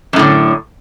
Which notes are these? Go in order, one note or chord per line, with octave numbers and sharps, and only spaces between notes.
F#2 A2 D3